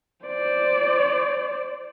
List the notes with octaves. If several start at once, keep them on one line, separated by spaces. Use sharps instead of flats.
C5 D5